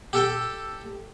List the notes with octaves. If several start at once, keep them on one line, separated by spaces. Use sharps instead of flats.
G4 A4 G5